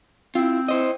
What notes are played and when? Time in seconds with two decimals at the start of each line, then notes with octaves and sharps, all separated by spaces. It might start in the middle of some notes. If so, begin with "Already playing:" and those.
0.35 C4 E4 F4
0.68 E4 C5 D#5